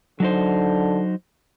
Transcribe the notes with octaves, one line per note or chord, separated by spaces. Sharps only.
D3 F#3 D#4 C5